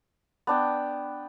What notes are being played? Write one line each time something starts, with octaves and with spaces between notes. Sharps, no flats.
B3 D4 G5